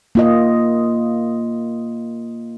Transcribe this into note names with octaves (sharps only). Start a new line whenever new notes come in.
A#3 F4 D#5